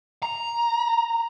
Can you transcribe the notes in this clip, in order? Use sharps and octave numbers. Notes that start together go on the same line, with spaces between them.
A#5